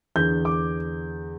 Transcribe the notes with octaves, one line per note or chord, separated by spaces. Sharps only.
E2 D3 G6
D6